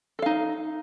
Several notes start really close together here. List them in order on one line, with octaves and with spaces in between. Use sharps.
A4 F5 D#4